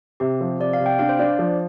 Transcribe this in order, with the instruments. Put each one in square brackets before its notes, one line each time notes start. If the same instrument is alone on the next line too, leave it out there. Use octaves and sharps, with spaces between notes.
[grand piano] C3 [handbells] G4
[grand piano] F3
[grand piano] C3 [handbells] D5
[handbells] F5
[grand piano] C3
[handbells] G5
[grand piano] D4 [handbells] F5
[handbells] C5
[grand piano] D4 [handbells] D5
[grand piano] F3